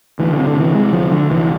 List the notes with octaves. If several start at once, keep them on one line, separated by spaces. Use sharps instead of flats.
D2 E3
D3
C3
D3
C3 E3
C3 G#3
D2 F3
D2 D3
C2 E3